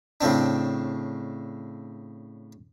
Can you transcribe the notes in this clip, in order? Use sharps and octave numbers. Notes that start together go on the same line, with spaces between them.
A2 C#3 C4 D4